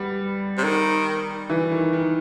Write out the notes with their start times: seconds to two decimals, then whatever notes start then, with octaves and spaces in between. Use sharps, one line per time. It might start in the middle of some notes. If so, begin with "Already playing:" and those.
Already playing: G3 B3
0.58 C3
0.64 D#3
1.50 E3
1.71 D#3
1.93 D#3